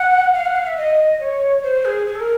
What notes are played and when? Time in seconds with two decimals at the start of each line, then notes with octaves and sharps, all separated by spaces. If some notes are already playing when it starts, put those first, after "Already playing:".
Already playing: F#5
0.34 F5
0.45 F#5
0.55 F5
0.66 E5
0.77 D#5
1.19 C#5
1.63 C5
1.85 G#4
2.06 G#4
2.15 A4
2.20 A#4